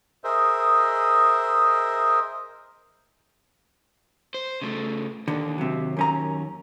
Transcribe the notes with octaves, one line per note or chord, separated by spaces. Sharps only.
G#4 A#4 C5 D#5 E5
C5
C#3 A3
D#2 D3
C3 F#3
F#2 C#4 A#5